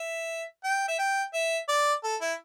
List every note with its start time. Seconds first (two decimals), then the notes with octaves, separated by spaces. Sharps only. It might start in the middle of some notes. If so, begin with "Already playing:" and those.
Already playing: E5
0.64 G5
0.88 E5
0.98 G5
1.33 E5
1.68 D5
2.03 A4
2.21 E4